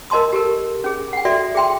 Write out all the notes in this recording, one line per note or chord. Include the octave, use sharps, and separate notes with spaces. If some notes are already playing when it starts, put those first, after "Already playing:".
A#4 D#5 A5 C6 D#6
G4 A4 A#4
C#4 G#4
F#5 G5
F#4 A4 D5 E5
G#4 E5 G5 C6